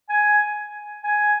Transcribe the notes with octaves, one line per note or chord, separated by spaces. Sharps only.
G#5
G#5